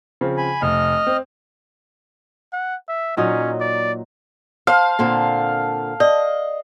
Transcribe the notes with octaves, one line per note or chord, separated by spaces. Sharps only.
C#3 F3 C4
G#5 B5
F1 D#5 F6
C4
F#5
E5
A#2 F#3 C#4 D#4
D5
C5 F5 A5
A#2 D3 C4
D5 D#5